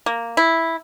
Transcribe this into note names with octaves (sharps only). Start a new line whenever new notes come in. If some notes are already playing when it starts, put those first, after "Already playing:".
A#3
E4